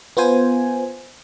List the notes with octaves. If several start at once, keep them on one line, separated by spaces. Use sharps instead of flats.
B3 F4 C5 G#5